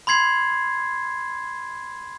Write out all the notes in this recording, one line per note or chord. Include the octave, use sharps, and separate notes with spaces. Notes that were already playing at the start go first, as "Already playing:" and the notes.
B5 C6 G#6 C7